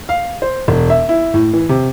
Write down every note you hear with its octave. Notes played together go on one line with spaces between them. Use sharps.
F5
C5
E1
E5
E4
A2
E3
C3